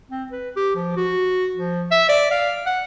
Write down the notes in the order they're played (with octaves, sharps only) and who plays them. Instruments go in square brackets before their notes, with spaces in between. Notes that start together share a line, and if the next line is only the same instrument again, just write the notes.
[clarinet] C4
B4
G4
F3
F#4
F3
E5
D5
F5
F#5